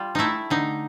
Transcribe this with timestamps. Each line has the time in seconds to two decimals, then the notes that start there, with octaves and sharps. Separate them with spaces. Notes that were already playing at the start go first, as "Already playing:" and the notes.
Already playing: G3 F4
0.15 A3 D#4 E4
0.50 D3 D#4